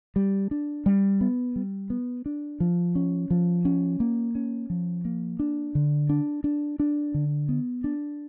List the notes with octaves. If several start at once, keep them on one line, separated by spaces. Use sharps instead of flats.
G3
D4
G3
B3
G3
B3
D4
F3
C#4
F3
C#4
A#3
C#4
F3
A#3
D4
D3
D4
D4
D4
D3
B3
D4